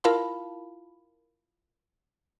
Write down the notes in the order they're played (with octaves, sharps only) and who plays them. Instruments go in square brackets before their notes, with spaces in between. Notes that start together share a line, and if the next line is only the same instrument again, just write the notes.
[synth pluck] E4 F4 A#4 F5 A5 B5